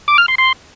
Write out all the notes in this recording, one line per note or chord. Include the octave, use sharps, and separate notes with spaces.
D6
F6
C6
C6